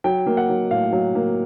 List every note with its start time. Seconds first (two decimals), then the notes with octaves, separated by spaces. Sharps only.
0.04 F#3 G5
0.26 A#3
0.37 F#5
0.49 F#3
0.71 A2 F5
0.93 F#3
1.15 A#3